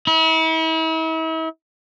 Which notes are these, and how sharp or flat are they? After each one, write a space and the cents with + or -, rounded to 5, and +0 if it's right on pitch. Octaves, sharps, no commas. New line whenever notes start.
E4 -40